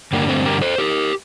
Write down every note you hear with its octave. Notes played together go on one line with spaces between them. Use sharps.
G2 D3 G3 A#3
A3 C4
G4 A#4
A4 C5
G4 A#4